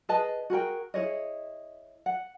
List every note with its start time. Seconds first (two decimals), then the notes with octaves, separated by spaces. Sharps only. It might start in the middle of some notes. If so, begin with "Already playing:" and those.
0.09 G#4 B4 D#5 A5
0.50 F#4 G#4 A#4 G5
0.94 E4 G#4 C#5 D#5
2.06 F#5